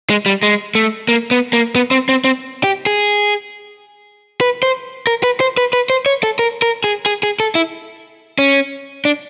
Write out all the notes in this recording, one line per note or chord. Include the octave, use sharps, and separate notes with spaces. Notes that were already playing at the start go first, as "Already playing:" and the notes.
G#3
G3
G#3
A3
A#3
B3
A#3
B3
C4
C4
C4
G4
G#4
B4
C5
A#4
B4
C5
B4
B4
C5
C#5
A4
A#4
A#4
G#4
G#4
G#4
A4
E4
C#4
D4